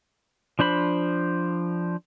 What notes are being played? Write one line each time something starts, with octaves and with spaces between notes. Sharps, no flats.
F3 D4 C5 B5